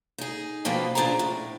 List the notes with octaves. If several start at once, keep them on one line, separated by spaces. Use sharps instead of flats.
D#4 G#4
B2 D3 F3 A#3 B4 G5
E2 A#2 D4 G#4 C5 A#5
A2